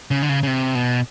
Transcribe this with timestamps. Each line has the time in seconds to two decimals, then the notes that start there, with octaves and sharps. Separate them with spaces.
0.11 C#3
0.22 D3
0.29 C#3
0.43 C#3
0.47 C3
0.75 B2